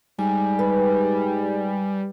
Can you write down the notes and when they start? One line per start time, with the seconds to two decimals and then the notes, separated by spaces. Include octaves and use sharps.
0.19 G#2 G3 G#5
0.59 B4